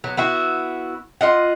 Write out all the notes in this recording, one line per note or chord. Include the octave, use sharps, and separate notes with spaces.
F#3 B3
B3 E4 F#4
F4 D#5 F#5